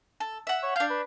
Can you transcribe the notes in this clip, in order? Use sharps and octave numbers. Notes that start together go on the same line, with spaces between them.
A4
E5 F#5
C#5
D4 F5 G6
B4